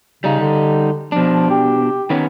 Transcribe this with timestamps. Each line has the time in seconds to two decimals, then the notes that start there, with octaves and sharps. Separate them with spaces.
0.24 C#3 G3 D#4
0.40 D3
1.12 B2 F3 D4
1.50 G4
2.10 D#3 B3 C#4